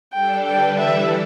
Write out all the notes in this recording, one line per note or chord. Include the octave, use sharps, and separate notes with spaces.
G3 D4 A4 G5
D3 G3 D4 B4 G5
E3 G3 E4 A4 E5